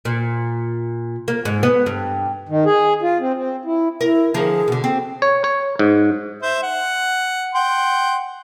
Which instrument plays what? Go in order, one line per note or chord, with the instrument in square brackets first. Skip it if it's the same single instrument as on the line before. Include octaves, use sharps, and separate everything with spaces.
[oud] A#2
A#3
G#2
B3
G2
[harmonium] D#3
G#4
F4
C4
C4
E4
[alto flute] E4 [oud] A#4
[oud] D3 F3 A#4 [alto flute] G#4
[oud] B2 D3
[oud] C4 [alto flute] A4
[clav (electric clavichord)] C#5
C#5
G#2
[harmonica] C5 E5
F#5
F#5 G5 C6